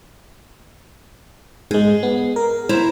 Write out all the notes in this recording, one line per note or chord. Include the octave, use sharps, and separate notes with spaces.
G#2 G#3 G#4
B3
A#4
E4 C5 A#5